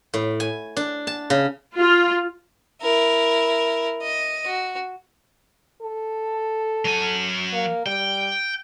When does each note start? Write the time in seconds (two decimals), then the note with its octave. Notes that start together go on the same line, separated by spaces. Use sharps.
0.14 A2
0.40 G#5
0.77 D4
1.07 A5
1.30 C#3
1.77 F4
2.82 E4 A#4
4.03 D#5
4.46 F#4
5.82 A4
6.85 F#3 G#5
7.53 A#3
7.86 G3 G5